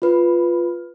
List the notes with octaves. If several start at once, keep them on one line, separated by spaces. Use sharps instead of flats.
F4 B4